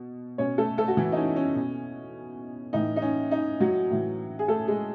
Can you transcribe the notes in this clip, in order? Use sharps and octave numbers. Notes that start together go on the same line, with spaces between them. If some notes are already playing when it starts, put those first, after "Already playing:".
Already playing: B2
B2 C#4 C#5
A3 A4
A3 A4
F#4
E3 E4
D#4
C#4
C#4
B2
A2 E3 D#4
D#4
C#4
D#4
F#3 F#4
A2 E3
G#4
A3 A4
G#3 G#4